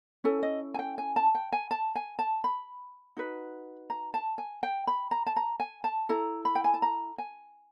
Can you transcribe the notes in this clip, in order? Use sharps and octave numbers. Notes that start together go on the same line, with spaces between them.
C#4 E4 A4 G#5
D#5
G#5
G5
G#5
A5
G5
G#5
A5
G#5
A5
B5
D#4 F#4 B4
A#5
A5
G#5
G5
B5
A#5
A5
A#5
G#5
A5
E4 A4 A#5
B5
G5
G#5
A5
A#5
G#5